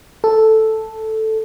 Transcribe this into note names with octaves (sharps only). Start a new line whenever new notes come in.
A4